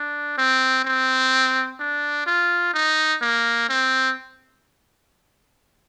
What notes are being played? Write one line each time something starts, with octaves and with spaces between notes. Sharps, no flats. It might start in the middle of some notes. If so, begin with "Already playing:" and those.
Already playing: D4
C4
C4
D4
F4
D#4
A#3
C4